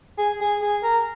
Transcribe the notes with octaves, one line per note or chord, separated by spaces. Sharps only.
G#4
G#4
G#4
A#4